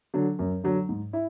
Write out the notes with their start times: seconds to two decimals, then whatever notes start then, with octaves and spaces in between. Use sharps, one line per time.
0.14 D3 F#3
0.39 F#2
0.64 D3 F#3
0.89 G#2
1.13 E4